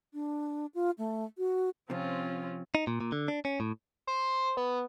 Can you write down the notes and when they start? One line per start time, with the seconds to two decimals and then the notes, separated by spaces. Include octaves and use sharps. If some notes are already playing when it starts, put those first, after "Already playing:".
0.14 D4
0.74 F4
0.98 A3
1.38 F#4
1.90 C3 F3 C4 C#4 F4
2.75 D#4
2.87 A#2
3.01 A#2
3.12 D3
3.28 D4
3.45 C#4
3.60 A2
4.07 C5
4.57 B3